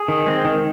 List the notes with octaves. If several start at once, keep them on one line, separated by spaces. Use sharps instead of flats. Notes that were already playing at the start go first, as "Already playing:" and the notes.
Already playing: G#4
D#3
G#3 C4
D#3